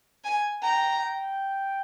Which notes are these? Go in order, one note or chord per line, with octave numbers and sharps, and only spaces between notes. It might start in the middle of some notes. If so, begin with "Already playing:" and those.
G#5
G5 A#5
G5